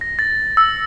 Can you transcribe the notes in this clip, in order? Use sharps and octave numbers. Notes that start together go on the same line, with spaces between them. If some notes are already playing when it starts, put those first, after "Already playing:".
A#6
A6
E6